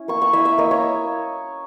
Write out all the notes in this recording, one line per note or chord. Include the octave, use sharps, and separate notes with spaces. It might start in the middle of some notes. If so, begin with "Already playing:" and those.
Already playing: C#4 E4
A#3 C#6
C#6
E4 E5
E5
A#3 D#5
C#5